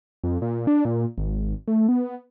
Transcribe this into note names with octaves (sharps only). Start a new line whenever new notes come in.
F2
A#2
D4
A#2
G#1
A3
B3